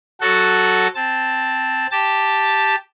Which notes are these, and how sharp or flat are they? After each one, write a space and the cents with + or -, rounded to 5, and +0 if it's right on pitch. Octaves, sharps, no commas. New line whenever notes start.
F#3 +0 F#4 +0 A4 +0
C4 +0 A5 +0
G4 +0 A5 +0